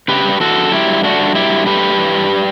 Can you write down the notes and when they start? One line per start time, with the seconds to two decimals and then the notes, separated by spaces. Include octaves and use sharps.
0.08 C#3 G4 B4
0.25 G3
0.40 E3 F#4 A4
0.56 F#2
0.72 F#3 E4 G4
0.88 G2
1.03 A3 D4 F#4
1.19 G2
1.35 F#3 E4 G4
1.50 G2
1.66 A3 G4 B4
1.82 G2
1.98 E3
2.14 G2
2.30 G3